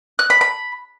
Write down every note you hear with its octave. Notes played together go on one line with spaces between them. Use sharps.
F#6
B5
B5